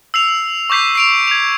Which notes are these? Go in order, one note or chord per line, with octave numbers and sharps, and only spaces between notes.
E6 C7 F7
C#6 D6 G6 B6 C7
C7 D7 F7
G#6 F7